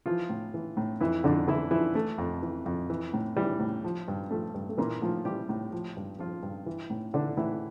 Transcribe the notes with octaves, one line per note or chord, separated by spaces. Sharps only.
E3 F3 F4
A2
E3
A2
F2 E3 E4
F2 D3 D4
D3 E3 E4
E3 F3 E4
E3 A3
F2
E3
F2
E3
A2
E3 G3
A2
F3
G2
F3 A3
G2
A3
A#2 E3 A#3
A2 F3 F4
E3 G3 G4
A2
F3
G2
F3 F4
G2
E3
A2
D3 E3 D4
A2 E3 E4